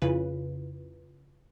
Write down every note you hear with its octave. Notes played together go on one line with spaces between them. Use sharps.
F2 C#3 E4 F4 B4